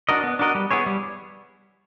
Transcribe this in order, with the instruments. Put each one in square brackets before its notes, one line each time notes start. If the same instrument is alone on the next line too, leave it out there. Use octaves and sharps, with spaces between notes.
[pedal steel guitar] D4 F#4 A#4 D#5
B3
D4 F#4 A#4 D#5
G3
B3 E4 G#4 C#5
G3